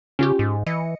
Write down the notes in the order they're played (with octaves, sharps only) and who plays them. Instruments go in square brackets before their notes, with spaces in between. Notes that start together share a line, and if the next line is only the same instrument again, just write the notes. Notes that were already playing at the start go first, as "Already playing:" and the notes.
[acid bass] C#3 [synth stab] C#4 F4 G4
[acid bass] G#2
[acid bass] E3 [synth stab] D#5 C#7